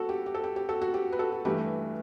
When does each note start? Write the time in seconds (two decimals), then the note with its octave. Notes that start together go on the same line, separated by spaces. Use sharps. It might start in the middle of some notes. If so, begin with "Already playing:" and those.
Already playing: G3 F#4 A4
0.09 G4
0.26 G4
0.35 A4
0.44 G4
0.56 G4
0.69 F#4 A4
0.81 F#4
0.94 G4
1.12 B4
1.19 F#4 A4
1.32 F#4
1.45 G2 E3 A3 G4 B4